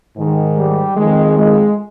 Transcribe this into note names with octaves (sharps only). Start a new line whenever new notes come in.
G#2 D#3
G3
F2 D#3 G#3
G#3